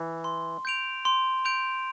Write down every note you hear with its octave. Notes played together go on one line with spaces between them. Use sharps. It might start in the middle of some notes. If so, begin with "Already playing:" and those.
Already playing: E3
C6
G6 D7 F7
C6
G6 D7 F7